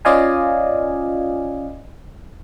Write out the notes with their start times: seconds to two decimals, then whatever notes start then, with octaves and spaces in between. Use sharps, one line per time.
0.05 C#4 F4 D5 D#5 F5 G#5